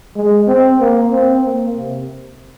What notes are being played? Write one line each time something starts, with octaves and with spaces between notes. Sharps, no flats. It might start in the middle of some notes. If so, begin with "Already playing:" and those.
G#3
C4
A#3
C4
A#3
C3